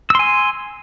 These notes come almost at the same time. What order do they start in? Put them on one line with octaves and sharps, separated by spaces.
E6 C6 G#5